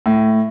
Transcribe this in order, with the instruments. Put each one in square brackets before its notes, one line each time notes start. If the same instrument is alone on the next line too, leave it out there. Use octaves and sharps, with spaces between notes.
[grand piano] A2